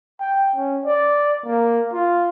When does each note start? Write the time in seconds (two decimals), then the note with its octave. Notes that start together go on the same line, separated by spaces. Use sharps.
0.20 G5
0.56 C#4
0.86 D5
1.45 A#3
1.93 F4